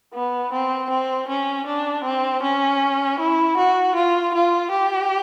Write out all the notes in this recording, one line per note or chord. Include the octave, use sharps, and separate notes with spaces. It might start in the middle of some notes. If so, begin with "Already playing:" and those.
B3
C4
C4
C#4
D4
C4
C#4
E4
F#4
F4
F4
G4